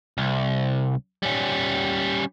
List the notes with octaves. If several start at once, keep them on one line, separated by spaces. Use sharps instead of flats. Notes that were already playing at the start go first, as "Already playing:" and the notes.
C2
G3 C#4